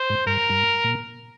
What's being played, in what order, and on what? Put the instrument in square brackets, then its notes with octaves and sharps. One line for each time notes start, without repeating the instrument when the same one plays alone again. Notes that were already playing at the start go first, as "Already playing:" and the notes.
Already playing: [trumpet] C5
[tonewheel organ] G#2
[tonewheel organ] G2 [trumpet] A#4
[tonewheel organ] G2
A#2